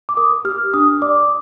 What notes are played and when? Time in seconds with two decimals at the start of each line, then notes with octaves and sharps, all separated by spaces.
0.09 D6
0.17 A#4 D#6
0.45 G4 F6
0.74 D4 D#6
1.02 D5 D6